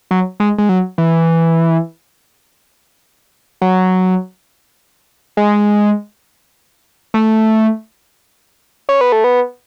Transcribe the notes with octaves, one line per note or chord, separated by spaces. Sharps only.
F#3
G#3
G#3
F#3
E3
F#3
G#3
A3
C#4
B3
A3
B3